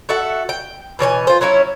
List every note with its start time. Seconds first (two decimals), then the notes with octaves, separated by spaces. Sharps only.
0.09 F#4 A4 E5 F#5
0.49 G5
0.99 B2 E3 C#5 G#5
1.27 F4 C5
1.41 F#3 C#4 E4 C#5